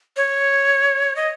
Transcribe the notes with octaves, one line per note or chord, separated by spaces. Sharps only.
C#5
D#5